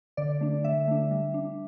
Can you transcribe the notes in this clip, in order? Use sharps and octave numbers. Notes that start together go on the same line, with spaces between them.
D3 D5
A3 D4
D3 E5
A3 D4
G3
D4